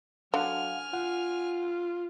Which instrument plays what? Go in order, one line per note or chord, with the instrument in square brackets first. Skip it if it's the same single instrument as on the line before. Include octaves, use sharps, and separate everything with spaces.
[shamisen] D3 [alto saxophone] F#3 [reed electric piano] F5 F#5 [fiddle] G#5 F6
[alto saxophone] F4 [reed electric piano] F#5